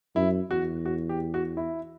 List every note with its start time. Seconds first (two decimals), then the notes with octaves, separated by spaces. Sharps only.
0.16 F#2 E4
0.51 E2 F#4
0.86 F#4
1.09 G4
1.34 F#4
1.57 E4